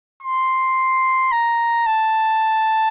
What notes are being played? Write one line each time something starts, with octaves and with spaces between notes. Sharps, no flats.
C6
A#5
A5